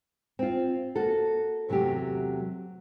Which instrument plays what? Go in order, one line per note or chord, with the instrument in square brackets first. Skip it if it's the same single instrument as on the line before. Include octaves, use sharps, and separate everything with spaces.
[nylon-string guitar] C4 F4
A#3 F#4 A4
E2 C3 F#3 A3 G4